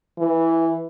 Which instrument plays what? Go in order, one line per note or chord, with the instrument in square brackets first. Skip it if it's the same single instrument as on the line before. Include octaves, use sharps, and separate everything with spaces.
[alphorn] E3